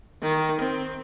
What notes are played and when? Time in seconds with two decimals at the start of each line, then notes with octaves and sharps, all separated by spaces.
0.22 D#3
0.61 C4